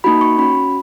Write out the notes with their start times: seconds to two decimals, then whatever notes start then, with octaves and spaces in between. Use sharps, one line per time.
0.04 A#3 D#4 F#4 B5
0.21 C#6
0.38 C#4 F#4 B5